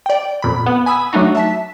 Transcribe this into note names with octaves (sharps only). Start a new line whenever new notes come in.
D5 G5
F2 A#2 B5
B3
G#5 B5 D#6 E6
F#3 A3 D4 D#4 F#4
E5 A5 B6